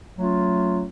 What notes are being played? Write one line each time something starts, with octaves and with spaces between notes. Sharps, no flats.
F#3 A3 C#4 F4